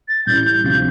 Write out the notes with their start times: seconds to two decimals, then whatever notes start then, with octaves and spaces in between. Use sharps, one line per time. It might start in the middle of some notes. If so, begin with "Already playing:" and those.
0.08 A6
0.26 A1 A2 G3 G6
0.64 D2 C3 F3 C4